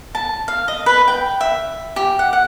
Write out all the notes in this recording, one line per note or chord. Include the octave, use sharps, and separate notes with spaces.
A5
F5
D#5
B4
G5
E5
G4
F#5
F#5